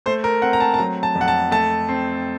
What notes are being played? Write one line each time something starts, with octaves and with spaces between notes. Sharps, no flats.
A3 C5
A#4
C4 F#5
A#5
A5
A5
F#3 A#5
A5
F2
F#5
A5
A3 A5
C4